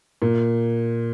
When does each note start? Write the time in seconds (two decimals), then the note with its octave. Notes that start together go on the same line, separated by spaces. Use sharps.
0.22 A#2